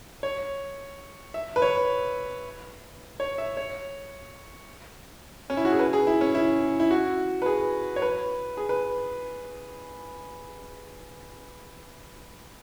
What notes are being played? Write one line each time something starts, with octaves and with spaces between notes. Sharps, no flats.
C#5
E5
B4
C#5
C#5
E5
C#5
C#4
E4
F#4
G#4
B4
G#4
E4
C#4
E4
E4
F#4
B4
G#4
C#5
B4
G#4
B4